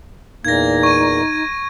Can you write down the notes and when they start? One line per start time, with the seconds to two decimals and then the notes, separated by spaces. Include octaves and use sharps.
0.45 E2 A#2 A#3 D#4 G#6 A#6
0.83 C#6 D#7